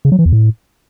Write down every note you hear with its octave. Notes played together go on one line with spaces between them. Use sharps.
C#3
F#3
E3
E2
A2